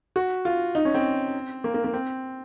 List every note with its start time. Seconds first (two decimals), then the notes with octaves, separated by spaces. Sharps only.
0.16 F#4
0.45 F4
0.75 D#4
0.85 C#4
0.94 C4
1.64 A#3
1.74 A#3
1.84 A#3
1.93 C4